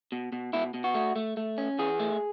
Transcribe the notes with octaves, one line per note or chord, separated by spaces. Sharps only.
B2
B2
B2 E4
B2
F#4
A3
A3
A3
C#4
E3 G#4
A3